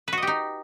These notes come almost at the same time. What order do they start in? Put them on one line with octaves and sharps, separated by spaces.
B4 F#4 D#5 G4 D#4